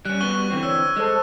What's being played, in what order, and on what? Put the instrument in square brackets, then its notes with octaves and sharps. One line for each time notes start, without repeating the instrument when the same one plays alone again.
[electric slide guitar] G3 C#4 [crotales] F#6
[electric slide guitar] G3 B3 F#4 [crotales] C#6 G7
[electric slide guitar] D3 E3 C4
[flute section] C#5 [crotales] E6
[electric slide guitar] G#3 [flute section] G#4 A4 C5